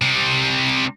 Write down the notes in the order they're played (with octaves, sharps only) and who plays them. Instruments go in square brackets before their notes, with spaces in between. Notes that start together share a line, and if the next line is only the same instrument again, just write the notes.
[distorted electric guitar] C3 G3